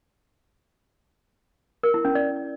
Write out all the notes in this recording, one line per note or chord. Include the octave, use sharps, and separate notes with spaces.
A#4
E4
C#4
D5